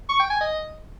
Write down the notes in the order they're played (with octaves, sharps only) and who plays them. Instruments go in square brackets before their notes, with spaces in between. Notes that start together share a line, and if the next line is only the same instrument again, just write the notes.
[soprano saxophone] C#6
G5
G#5
D#5